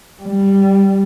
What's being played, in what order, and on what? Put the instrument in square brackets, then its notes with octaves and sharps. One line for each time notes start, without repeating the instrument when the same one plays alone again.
[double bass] G3